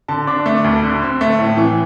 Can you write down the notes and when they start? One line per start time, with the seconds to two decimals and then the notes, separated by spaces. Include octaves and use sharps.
0.08 D3 A5
0.27 D4 D6
0.46 A3
0.64 D2
0.83 D3
1.02 C4
1.21 A3
1.39 A2
1.57 E3